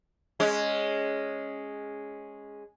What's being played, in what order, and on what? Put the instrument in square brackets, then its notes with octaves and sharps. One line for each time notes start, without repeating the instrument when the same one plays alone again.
[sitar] G#3 C#4